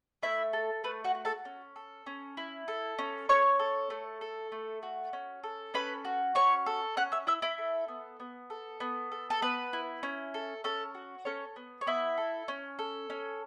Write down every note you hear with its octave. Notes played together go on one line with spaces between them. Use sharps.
A3 E4 E5
A4
A3 B4
F#4 F#5
F#4
A4 A5
C#4
A4
C#4
E4
A4
C#4
C#4 C#5 C#6
A4
A3
A4
A3
F#4
C#4
A4
C#4 B4 B5
F#4
C#4 C#5 C#6
A4
C#4 F#5 F#6
E5 E6
E4 E5 E6
E4 E5
A4
B3
B3
A4
B3
A4
A4
B3 B4
E4
C#4
A4
C#4 A4
F#4
C#4 A4 C#5
B3
C#5
B3 E4 E5
A4
C#4
A4
C#4